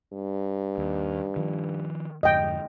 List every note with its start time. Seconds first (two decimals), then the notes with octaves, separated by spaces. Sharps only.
0.13 G2
0.78 D#2
1.36 D#3 F3
2.23 F2 G#2 D3 D#5 G5